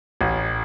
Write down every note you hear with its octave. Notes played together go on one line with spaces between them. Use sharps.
A1